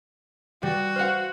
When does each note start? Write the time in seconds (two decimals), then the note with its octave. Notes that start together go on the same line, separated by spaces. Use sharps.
0.63 G3 F#4
0.96 C5 F5 F#5 F6 F#6